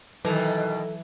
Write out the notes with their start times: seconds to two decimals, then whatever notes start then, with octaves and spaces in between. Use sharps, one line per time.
0.25 B2 D#3 E3 F#3 A4 A#5